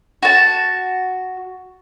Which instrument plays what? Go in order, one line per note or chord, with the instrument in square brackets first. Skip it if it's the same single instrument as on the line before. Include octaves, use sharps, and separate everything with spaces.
[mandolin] F#4 A5